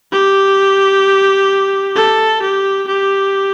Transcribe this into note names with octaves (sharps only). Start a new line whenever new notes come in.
G4
A4
G4
G4